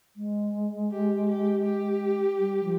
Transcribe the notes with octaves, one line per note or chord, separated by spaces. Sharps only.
G#3
G4
G4
G4
G3
F3